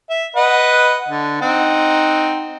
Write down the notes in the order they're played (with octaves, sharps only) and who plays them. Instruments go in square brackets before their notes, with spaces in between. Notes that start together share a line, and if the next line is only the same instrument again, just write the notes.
[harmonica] E5
B4 D#5 F#5
D3
C4 D#4 F#5